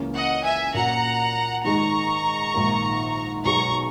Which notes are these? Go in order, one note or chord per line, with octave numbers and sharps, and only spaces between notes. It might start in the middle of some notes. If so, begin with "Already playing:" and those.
Already playing: C#2 C#3 E3 A#3 C#4
D#5 F#5
E5 G#5
A#2 A#3 C#4 F#4 F#5 A#5
G#2 D#3 G#3 D#4 G#4 A#5 C#6
A#1 G#2 D#3 A#3
B1 B2 G#3 A#5 C#6